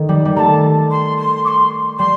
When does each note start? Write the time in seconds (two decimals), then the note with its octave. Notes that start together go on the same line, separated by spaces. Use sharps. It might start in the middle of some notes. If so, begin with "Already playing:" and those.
Already playing: D#3 A3
0.09 G3
0.25 G3
0.36 A3 A5 A#5
0.91 C6
1.18 C6
1.45 D6
1.48 C6
1.99 G3 C6